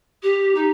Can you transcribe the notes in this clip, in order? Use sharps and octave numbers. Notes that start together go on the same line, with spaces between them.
G4
D#4